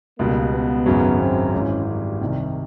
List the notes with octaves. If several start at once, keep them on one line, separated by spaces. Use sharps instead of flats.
C#2 B2 G3 A#3
B3
G#1 F#2 C#3 F#3
C4
G#1 G#2 E3 C#4
G3
C2 C3 D#3 G3